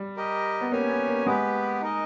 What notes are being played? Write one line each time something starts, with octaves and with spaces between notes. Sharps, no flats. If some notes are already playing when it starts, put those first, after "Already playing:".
Already playing: G3
G4 A#4 D#5
B3
A#3 C#4 G4 C#5 G#5
B3
A#3
G#3 B3 G4 B4
D#4 A#4 D#5